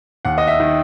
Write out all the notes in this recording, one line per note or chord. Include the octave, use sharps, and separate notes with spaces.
D#2 F#5
D#5
E5
D#3